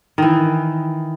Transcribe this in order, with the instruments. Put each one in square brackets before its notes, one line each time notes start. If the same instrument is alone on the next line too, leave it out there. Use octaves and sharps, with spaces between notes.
[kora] D#3 E3